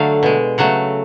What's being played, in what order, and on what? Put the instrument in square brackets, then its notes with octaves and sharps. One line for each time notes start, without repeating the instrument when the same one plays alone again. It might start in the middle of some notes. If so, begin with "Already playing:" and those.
Already playing: [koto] D3 F#3 A3 F5
B2 G#3
C#3 F#3 A3 F#5